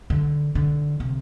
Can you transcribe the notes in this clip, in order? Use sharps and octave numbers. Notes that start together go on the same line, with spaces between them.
D3
D3
C3